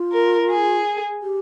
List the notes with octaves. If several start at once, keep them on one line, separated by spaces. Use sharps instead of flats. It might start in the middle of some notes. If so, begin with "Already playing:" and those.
Already playing: F4
A#4
G#4
G4